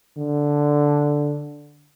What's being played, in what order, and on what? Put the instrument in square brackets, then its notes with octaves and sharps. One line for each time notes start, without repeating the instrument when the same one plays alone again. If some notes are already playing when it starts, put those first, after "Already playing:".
[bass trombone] D3